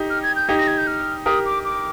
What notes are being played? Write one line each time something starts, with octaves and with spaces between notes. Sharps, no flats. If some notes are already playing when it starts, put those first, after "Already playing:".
Already playing: D#4 G4
F6
G#6
G6
D#4 G4 G#6
A#6
G#6
G6
F6
G4 A#4 D#6
D6
D6